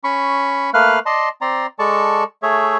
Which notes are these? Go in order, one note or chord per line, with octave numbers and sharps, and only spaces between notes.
C#4 B5 C#6
A3 A#3 B4 F5 F6 F#6
D5 D#5 A5 C6
C4 D5 A#5 C6
G#3 A4 D5 A5 C#6
A3 G#4 C#5 E5